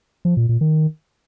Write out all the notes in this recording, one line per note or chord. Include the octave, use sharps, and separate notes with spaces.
F3
A#2
A#2
D#3